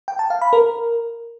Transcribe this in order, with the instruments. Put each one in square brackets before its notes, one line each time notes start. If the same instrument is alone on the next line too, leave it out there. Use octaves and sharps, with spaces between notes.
[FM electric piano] G5
A5
F5
B5
A#4